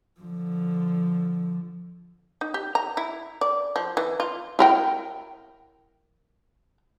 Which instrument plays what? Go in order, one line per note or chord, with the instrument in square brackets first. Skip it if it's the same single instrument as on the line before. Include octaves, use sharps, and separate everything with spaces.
[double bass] D3 F3
[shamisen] D#4
G4
A#5
E4
D5
F3
E3
F4
E4 A#4 G5